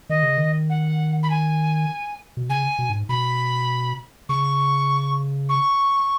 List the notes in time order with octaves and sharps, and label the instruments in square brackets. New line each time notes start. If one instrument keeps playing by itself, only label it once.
[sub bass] D#3 [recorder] D#5
[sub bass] C#3
D#3
[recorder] F#5
B5
G#5
[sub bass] B2
[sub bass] C#3 [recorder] G#5
[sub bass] B2
G#2
[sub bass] B2 [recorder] B5
[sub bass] C#3 [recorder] C#6
[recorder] C#6